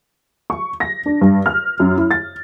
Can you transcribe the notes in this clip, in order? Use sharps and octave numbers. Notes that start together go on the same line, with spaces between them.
C#6
A#6
D4
G2
F6
F#2
E4
A6